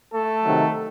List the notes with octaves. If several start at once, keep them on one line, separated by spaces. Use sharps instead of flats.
A3 A4
C3 D#3 F#3